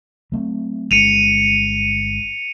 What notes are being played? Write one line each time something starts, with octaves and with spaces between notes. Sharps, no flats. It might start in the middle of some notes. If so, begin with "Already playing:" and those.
F#3 A3 C4
G1 G#3 C#4 C#7 D#7 F7